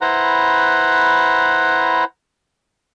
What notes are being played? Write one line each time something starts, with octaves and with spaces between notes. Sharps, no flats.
E4 B4 C5 F#5 A#5